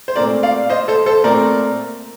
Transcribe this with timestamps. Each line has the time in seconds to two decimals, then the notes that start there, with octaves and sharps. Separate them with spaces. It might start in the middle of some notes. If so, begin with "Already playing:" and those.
0.08 C5
0.16 A#2 A3 C4 A#4 D5
0.43 D5 F5
0.70 C5 D#5
0.88 A4 C5
1.06 A4 C5
1.24 A#2 A3 C4 A#4 D5